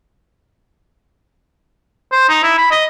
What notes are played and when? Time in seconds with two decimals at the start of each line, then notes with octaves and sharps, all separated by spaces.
2.12 C5
2.29 D#4
2.43 E4
2.58 B5
2.71 D#5